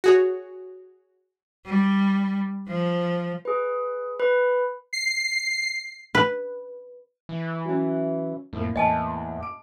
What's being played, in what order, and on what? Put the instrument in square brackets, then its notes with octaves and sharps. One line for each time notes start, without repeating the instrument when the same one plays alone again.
[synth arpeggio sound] F#4 G#4 C#5
[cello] G3
F3
[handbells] G#4 B4
B4 B5
[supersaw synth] C7
[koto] B4
[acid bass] E3
[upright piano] F#3 C#4
[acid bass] F2 [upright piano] A2 A#3
[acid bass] E2 [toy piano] D#5 G#5 A5
[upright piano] D6 D7